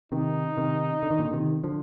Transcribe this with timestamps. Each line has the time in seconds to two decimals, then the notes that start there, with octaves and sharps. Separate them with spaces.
0.12 C3 D#3 D#4
0.57 C3 D#3
1.03 D3
1.11 D#3
1.19 A#2 D3
1.33 C3 D#3
1.64 D3 F3